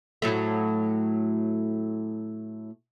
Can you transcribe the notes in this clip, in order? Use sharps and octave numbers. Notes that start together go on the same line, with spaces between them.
A2 F#3 A3